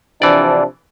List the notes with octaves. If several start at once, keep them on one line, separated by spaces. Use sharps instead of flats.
C3 E3 F3 D4 D5